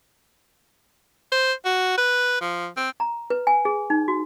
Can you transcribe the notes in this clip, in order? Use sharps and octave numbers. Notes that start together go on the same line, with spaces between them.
C5
F#4
B4
F3
C4
A#5
B4
G#5
G#4
D#4
F#4